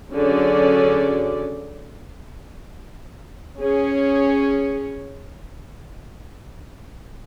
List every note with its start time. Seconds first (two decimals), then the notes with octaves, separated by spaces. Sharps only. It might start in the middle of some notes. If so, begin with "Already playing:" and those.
0.13 D3 F#3 C#4 G#4 D5
3.61 C#4 G#4 C#5